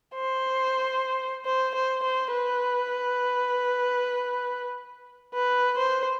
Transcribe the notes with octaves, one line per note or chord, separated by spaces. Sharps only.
C5
C5
C5
C5
B4
B4
C5